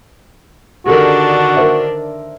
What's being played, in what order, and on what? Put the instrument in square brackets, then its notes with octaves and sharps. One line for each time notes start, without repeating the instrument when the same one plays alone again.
[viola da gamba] D3 D#3 D4 [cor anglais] F#4 [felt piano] G4 A4 A#4
[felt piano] A#4 C5 E5